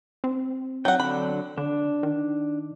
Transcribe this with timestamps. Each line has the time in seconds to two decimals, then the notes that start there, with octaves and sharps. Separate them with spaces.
0.24 C4
0.85 F#3 F#5 G5
1.00 D3 F#3 D4 B5
1.58 D3 D4
2.03 D#3